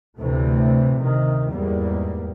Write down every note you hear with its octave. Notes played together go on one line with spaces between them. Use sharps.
D2 A2 C3 E3 A3
C3 D#3
E2 G#2 G3 A#3